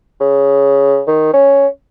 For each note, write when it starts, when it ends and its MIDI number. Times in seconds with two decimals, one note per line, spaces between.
0.20 1.01 49
1.07 1.29 51
1.33 1.67 61